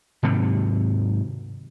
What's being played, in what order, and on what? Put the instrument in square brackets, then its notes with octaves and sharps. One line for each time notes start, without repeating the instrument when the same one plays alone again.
[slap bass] G#2 C3 D#3 F#3